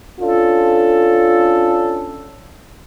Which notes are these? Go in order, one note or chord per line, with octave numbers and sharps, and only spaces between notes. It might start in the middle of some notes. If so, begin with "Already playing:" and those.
C#4 D4 F4 A4